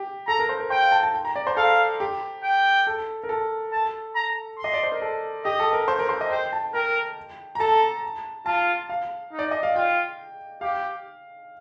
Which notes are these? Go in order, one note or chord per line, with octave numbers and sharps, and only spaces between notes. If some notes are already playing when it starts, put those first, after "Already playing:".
Already playing: G4
A4 A#5
A#4
C5
A#4
C5 G5
F5
A5
A5
G5
A#5
D5
C5
A4 F5
G4
G5
A4
A#4
A4
A5
A#5
C6
D#5
D5
C5
A#4
A4
G4 D#5
A4
A#4
C5
A#4
C5
D#5
C5 G5
A5
A#4 G5
A#5
A4 A5
F4 A5
F5
D#4
D5
D#5
F5
F4 G5
G4 F5